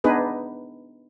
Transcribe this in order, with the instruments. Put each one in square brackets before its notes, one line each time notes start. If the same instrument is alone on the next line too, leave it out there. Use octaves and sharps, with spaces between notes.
[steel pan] B3 D4 D#4 G#4 B4